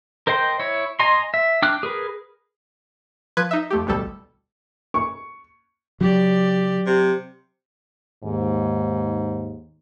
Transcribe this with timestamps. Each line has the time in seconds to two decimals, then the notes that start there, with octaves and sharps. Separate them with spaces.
0.27 A#4 C5 D#5 G5 C6
0.60 E4 C#5
0.99 D#5 G#5 A#5 C6
1.34 E5
1.62 D4 G5 D6 F6 F#6
1.83 G#4 A#4 B4
3.37 F3 B4 F#6 G#6
3.51 D#4 E5
3.70 F2 A3 G4
3.86 A1 D2 B2 G3 A4
4.94 C#6
6.01 C#3 F#3 G4 D5
6.87 C3
8.23 D#2 G#2